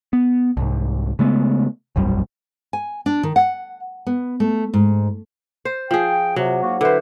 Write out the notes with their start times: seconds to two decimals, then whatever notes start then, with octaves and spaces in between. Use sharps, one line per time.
0.13 B3
0.57 C2 G#2
1.19 C#3 G#3 A3 B3
1.96 E1 A#1 F#2 G3
2.73 G#5
3.06 D4
3.23 D#3
3.36 F#5
4.07 B3
4.40 A3
4.74 G#2
5.65 C5
5.91 F3 G#4 G5
6.36 C3 F#3
6.63 G#2 A#3 F#4
6.81 D3 E4 B4 C5